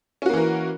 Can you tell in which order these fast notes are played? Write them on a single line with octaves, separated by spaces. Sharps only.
C#4 F#4 A#3 E3 A#4